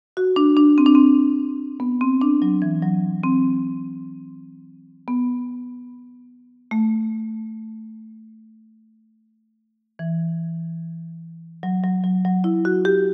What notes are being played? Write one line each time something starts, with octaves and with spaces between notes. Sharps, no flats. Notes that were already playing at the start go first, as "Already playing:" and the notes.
F#4
D4
D4
C4
D4
C4
B3
C4
D4
F#3
E3
F#3
C4
B3
A3
E3
F#3
F#3
F#3
F#3
E4
F#4
G4